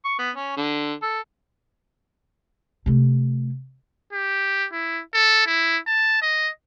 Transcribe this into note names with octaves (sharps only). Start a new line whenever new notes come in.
C#6
B3
C#4
D3
A4
C3 A3
G4
E4
A4
E4
A5
D#5